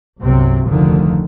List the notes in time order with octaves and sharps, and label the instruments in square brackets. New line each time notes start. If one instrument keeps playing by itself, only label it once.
[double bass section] G1 C2 C3 F#3 C4
F1 D2 D3 D#3 F3